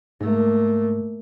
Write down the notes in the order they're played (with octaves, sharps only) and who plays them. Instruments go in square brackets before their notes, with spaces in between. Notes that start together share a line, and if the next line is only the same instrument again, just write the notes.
[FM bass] G#2 [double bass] A3 A#3